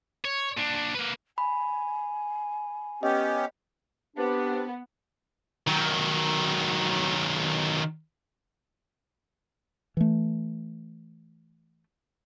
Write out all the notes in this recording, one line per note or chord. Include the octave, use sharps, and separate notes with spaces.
C#5
A#2 D4
A#3 B4
G#5 B5
B3 C#4 G4 D#5
B3 C4 D4 G4
D#3 F#3
E3 A3